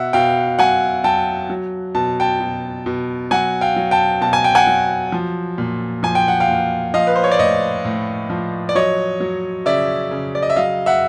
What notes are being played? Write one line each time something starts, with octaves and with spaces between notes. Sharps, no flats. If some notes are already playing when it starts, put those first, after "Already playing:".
Already playing: B2 E5 F#5
B2 F5 G5
F#3 F#5 G#5
F#3 G5 A5
F#3
B2 A5
G5 A5
B2
B2
F#3 F#5 G#5
F5 G5
F#3
G5 A5
B2 A5
G#5
G5
F#5 G#5
F#3
F3
A#2
F3 G#5
G5
F#5
F5 G5
A#2
F3 D#5 F5
B4
C5
C#5
D5
A2 C#5 D#5
A2
F3
D5
F#3 C#5 D#5
F#3
C#3 D5 E5
C#3
D5
D#5
E5
F#3 D#5 F5
E5 F#5